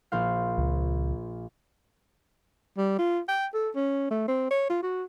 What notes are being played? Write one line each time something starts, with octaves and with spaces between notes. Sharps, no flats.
A#1 C5 F5
C#2
G3
F4
G5
A4
C#4
A3
C4
C#5
F4
F#4